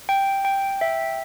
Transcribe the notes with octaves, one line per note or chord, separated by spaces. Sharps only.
G5
G5
E5